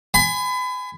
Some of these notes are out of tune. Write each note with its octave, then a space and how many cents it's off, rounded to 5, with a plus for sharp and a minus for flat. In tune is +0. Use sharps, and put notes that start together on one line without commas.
G#5 +0 B5 +35